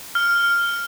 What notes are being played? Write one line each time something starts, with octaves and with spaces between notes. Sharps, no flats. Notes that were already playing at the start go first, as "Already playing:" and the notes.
F6